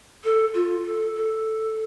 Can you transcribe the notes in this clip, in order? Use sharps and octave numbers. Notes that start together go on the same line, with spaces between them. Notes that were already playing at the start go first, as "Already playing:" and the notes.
A4
F4
A4
A4